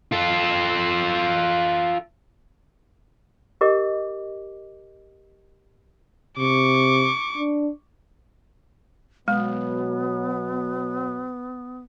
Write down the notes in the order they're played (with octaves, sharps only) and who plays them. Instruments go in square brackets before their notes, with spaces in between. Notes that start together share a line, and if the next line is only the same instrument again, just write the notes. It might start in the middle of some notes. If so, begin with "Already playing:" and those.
[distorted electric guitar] F4 A4
[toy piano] G4 A#4 D#5 D6
[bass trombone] C3 [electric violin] C#6 D6
[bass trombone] D4
[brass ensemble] B2 F#3 [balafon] G#3 [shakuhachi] B3